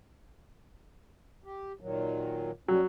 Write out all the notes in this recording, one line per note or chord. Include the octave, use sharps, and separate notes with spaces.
G4
A#2 D#3 F#3
F#3 G3 C#4